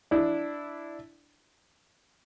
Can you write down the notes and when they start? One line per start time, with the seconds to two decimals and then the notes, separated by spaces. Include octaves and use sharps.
0.11 D4 E4